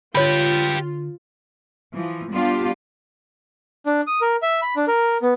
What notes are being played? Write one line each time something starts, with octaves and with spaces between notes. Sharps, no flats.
D3 F4 G4 B4 C#5 B5
E3 F3
G3 B3 D4 F4 G4
D4
D#6
A#4
E5
B5
D4
A#4
B3